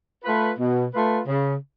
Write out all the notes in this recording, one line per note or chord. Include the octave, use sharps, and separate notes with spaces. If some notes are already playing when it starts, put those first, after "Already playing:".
A3 F4 B4
B2
A3 F4 B4
C#3